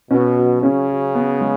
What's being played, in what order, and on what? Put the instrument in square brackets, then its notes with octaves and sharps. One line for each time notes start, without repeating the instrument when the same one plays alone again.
[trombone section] B2 [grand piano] C#4
[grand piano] F#3
[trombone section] C#3 [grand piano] C#4
[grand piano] F#3
B3
G#3